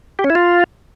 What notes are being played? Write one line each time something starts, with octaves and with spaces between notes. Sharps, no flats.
G4
C#4
E4
F4